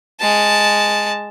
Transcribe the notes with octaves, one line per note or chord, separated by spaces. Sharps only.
G#3 A5